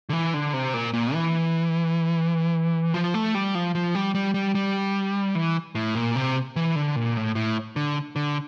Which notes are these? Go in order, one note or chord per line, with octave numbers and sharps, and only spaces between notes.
D3
E3
D3
C3
A#2
A#2
E3
F3
A3
G3
F3
F3
G3
G3
G3
G3
E3
A2
A#2
C3
E3
D3
A#2
A2
A2
D3
D3